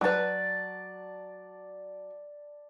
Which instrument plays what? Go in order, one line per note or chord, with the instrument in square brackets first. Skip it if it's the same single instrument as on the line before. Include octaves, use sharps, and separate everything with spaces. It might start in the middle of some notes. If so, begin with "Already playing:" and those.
[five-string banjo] F#3 B4 [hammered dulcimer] D5 A5